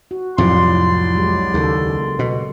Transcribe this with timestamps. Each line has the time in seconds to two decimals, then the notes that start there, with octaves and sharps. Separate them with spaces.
0.11 F#4
0.38 C2 F2 A2 C3 F#3 D5 C6
1.14 F#3 G#3 G4
1.54 D#2 C#3 A#3 A4
2.19 B2